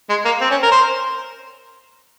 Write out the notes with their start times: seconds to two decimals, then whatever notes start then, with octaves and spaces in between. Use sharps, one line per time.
0.10 G#3
0.25 A#3
0.41 C4
0.51 C#4
0.62 A#4
0.72 C5